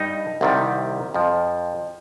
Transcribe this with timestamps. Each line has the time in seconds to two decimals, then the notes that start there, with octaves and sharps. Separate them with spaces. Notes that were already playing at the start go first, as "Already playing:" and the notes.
Already playing: G2 G3 D#4
0.41 C2 C3 D#3 G3
1.14 F2 F3